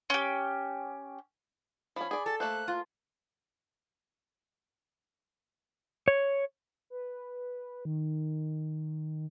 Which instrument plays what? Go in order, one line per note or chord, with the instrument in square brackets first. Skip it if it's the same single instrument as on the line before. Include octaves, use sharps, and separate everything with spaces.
[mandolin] C#4 G4
[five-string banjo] F3 C#4 [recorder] B5
[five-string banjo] G#4 D5
[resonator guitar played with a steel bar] A4 [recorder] A6
[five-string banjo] A3 A#3 C5 [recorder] F#6
[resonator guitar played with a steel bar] F4
[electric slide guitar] C#5
[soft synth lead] B4
D#3